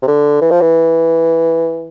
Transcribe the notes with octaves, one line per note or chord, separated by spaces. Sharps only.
C3
D3
E3
F3
E3